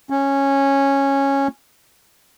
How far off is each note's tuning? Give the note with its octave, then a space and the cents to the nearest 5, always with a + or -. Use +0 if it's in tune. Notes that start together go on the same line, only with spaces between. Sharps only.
C#4 -10